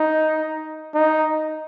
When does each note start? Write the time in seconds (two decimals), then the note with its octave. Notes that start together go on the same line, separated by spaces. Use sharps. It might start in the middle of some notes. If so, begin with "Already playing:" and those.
Already playing: D#4
0.94 D#4